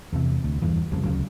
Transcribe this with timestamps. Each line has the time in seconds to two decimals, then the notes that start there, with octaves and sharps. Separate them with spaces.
0.13 E2 C3
0.44 D2
0.62 E2 G2 E3
0.91 F1 F2 C#3 G3
1.04 D2 C#3 F#3